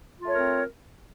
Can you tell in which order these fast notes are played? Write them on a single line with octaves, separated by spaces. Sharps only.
F4 A3 C#5 A#4 C4